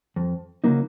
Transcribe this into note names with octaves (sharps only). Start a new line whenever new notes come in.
F2
C#3 F#3 A#3 D#4